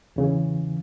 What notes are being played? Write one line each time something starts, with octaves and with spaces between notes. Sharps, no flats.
E2 C#3 E3